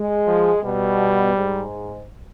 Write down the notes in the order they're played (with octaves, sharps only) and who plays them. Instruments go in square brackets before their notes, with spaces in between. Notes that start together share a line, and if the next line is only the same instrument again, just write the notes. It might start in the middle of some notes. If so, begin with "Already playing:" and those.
Already playing: [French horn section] G#3
[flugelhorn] F3
[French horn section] B2 [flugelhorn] G3
[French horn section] G#2